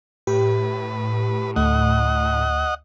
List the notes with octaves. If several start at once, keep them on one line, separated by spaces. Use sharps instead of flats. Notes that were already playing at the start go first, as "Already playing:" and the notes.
A2 G4 B4
D2 A3 D#5 F#5